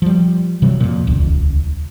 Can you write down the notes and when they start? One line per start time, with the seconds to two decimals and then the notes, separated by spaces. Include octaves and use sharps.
0.02 F3 G3
0.62 C3 E3 F#3 G3
0.80 F2 A#2
1.07 D#1 C#2